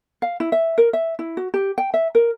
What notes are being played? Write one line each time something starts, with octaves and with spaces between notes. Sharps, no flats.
F5
E4
E5
A#4
E5
E4
F#4
G4
G5
E5
A#4